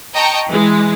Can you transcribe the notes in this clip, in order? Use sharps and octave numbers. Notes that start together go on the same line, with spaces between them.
D#5 G5 A5 A#5 C#6
E3 G#3